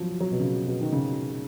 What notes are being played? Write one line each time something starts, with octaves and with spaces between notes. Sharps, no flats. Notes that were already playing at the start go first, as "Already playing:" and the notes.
Already playing: F3 F#3
F#3
B2
C#3
B2
D#3
C#3